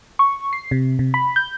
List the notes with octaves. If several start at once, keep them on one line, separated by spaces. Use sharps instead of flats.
C#6
C7
C3
C3
B5
G6